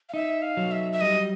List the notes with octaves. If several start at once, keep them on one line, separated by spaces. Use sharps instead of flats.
F5
D#4 E5
F5
F#3
E5
E5
G3 D#5